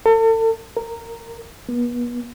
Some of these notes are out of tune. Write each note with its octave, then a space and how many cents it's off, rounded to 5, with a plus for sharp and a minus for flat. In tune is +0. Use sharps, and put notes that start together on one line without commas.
A4 +40
A#4 -10
B3 -35